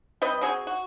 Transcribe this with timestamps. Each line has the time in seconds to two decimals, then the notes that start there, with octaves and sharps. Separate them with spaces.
0.22 G3 C4 B4 D#5
0.41 C4 F#4 G#4 G#5
0.67 F#4